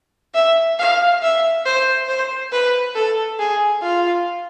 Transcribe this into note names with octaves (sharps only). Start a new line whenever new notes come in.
E5
F5
E5
C5
C5
B4
A4
G#4
F4